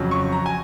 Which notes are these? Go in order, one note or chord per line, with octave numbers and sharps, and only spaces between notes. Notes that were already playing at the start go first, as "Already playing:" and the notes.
Already playing: F2 C#3 F#3
C#6
A#5
G#5